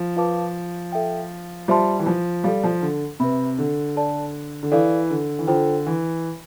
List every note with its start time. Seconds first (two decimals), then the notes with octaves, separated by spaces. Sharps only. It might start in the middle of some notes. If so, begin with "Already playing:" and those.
Already playing: F3
0.16 F4 B4 F5 A5 D6
0.92 A4 E5 G5
1.68 G3 F4 C5 E5 A5 C6
1.99 E3
2.06 F3
2.44 G3 A4 D5 F5
2.64 F3
2.82 D3
3.20 C3 B4 E5 B5
3.58 D3
3.96 A4 D5 A5
4.63 D3
4.72 E3 A4 D5 F5
5.10 D3
5.39 E3
5.47 D3 F4 A4 C5 G5
5.86 E3